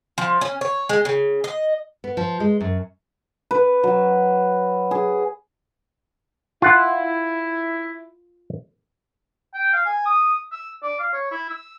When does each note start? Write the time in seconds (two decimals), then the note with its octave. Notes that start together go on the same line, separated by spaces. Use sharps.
0.18 F3
0.41 C#4
0.61 C#5
0.89 G#3
1.05 C#3
1.44 D#5
2.04 B3
2.17 F3
2.40 G#3
2.61 F#2
3.51 B4
3.83 F#3
4.91 G#4
6.62 E4 F4 F#5
9.54 G5
9.73 F5
9.85 G#5
10.05 D#6
10.52 E6
10.83 D5
10.99 F5
11.13 C#5
11.31 E4
11.50 E6